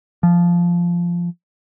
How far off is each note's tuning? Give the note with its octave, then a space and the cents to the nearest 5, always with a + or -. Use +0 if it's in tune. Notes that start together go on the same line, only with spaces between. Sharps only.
F3 -10